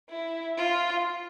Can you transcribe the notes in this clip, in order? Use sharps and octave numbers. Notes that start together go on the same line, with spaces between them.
E4
F4